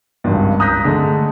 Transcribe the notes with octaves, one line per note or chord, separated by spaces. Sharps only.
G#1 C#2 G2
A#5 D#6 F#6 G6 A#6 B6
D3 G#3 A3